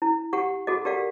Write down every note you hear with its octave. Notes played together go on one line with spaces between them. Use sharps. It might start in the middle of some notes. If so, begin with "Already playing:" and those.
E4
G4 F#5 C#6
F#4 G#4 A4 D#5
G4 A#4 D5 F5 F#5